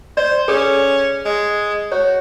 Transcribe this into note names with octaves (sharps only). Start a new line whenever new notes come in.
C5 D5
C#4 G#4 A4
G#3
F#4 C#5